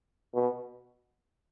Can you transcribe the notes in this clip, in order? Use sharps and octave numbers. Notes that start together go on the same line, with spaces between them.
B2